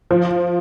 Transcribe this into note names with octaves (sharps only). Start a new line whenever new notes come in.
F3